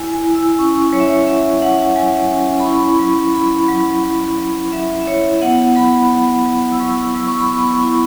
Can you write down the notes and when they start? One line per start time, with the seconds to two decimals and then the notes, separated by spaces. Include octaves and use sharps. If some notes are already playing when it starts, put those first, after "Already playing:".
Already playing: E4 G#5
0.12 G#5
0.24 E4
0.35 E6
0.58 C#4 C#6
0.92 F#3 C#5
1.00 E5
1.08 C#5
1.27 F#3 E5
1.62 F#3 F#5
1.96 F#3 G#5
2.31 C#4
2.60 B5
2.65 E4 C#6
3.00 F#3
3.34 E4 B5
3.68 F#3
4.03 F#3
4.39 F#3
4.72 F#3 E5
5.02 E5
5.07 E4 C#5
5.41 B3 F#5
5.76 F#3 B5
6.10 F#3
6.46 F#3
6.72 E6
6.79 F#3 C#6
7.14 F#3 E6
7.28 C#6
7.39 B5
7.49 B3 C#6
7.83 E4